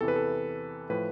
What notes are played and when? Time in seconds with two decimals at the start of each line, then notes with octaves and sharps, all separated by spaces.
0.01 E2 C3 E3 A4
0.08 B4
0.16 A4
0.90 A2 F3 B4